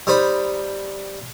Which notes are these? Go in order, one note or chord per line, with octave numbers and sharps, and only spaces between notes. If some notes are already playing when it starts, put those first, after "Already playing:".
G3 D#4 C5 B5